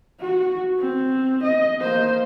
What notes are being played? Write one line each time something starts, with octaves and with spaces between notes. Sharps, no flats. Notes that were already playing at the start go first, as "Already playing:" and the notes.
F#4
C4
D#5
A#3 C5